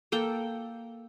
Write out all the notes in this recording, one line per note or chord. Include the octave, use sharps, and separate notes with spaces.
A#3 A4 G5